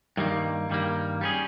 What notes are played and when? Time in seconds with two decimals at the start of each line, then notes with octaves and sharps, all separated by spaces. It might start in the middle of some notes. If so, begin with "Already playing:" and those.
0.17 G2 D#3 G3 A#3
0.69 G2 D#3 G3 A#3
1.21 G3 C#4 G#4